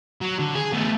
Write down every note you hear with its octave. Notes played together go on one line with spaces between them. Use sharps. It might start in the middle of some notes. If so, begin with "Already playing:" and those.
F#3
D3
G#4
A3 B3